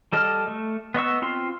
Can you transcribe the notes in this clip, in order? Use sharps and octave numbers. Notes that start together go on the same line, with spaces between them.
G3 A4 D#5 F6
A3
B3 D#5 C#6 E6
C4 F4 C6